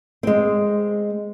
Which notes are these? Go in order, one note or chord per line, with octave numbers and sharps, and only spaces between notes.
G#3 C4